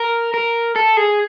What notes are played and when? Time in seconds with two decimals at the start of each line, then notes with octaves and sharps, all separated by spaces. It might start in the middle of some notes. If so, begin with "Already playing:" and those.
Already playing: A#4
0.34 A#4
0.76 A4
0.97 G#4